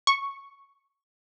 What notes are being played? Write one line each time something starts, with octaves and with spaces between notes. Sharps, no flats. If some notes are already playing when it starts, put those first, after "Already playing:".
C#6